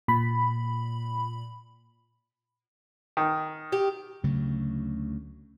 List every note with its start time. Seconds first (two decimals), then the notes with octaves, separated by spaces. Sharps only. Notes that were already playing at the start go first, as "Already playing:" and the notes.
0.08 A#2 B5
3.17 D#3
3.72 G4
4.24 D2 C#3 F#3 A3